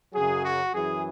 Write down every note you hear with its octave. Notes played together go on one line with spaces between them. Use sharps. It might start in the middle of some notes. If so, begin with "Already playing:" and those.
F#2 C#3 F#3 G#4
F#4
F#2 E3 G#4